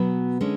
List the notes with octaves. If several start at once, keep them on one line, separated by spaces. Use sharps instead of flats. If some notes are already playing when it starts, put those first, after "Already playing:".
Already playing: B2 F#3 B3 B4
D3 G#3 C#4